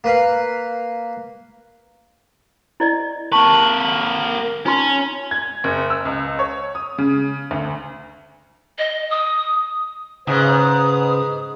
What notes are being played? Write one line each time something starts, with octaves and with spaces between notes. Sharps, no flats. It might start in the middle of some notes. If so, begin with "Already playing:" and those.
A#3 B4 F5
E4 D5 D#5
A#3 B4 A5 C#6
C#4 D#4 F4 C6
G#6
F#1
E6
C#2
C#5
D#6
C#3
D2
D#5
D#6
G#2 C#3 B4 D#6